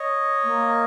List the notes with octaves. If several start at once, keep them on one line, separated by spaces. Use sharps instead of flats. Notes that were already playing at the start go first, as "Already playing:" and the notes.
Already playing: C#5 D#5
A#3